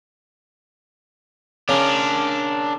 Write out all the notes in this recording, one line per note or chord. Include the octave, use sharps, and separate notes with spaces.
C#3 D4 A#4